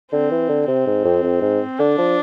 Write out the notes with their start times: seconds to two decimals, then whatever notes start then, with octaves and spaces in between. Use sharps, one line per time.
0.12 D3 C4
0.31 E3
0.49 D3
0.67 C3 C4
0.86 G#2
1.04 F2
1.23 F2
1.41 G#2
1.79 D3 D4
1.98 F3